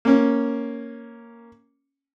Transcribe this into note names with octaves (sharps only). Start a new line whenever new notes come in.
A#3 C#4